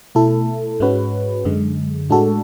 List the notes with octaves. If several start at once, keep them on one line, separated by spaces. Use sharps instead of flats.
B2 A3 E4 A4
G#2 G#3 C#4 F#4 B4
F#2 D3 G#3
A2 G#3 D4 F#4 A4